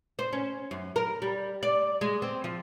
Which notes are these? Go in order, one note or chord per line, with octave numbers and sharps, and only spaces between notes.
C5
C#4
F#2
A#4
G3
D5
G#3
C4
F3